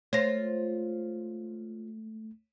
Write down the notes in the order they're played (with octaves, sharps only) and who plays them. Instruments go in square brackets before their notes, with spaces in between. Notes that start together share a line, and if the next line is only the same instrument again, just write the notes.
[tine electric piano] A3 [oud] F4 C5 [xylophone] C#5 A#6